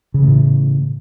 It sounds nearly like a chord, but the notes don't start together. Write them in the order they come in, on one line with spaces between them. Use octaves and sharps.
C#3 E3 A3 A2